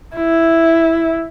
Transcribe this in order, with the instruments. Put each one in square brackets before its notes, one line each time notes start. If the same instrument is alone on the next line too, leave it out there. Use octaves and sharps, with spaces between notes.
[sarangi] E4